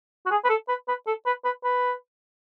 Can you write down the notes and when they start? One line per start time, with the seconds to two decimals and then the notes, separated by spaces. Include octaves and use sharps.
0.26 F#4
0.31 G#4
0.45 B4
0.49 A4
0.68 B4
0.88 B4
1.07 A4
1.26 B4
1.45 B4
1.64 B4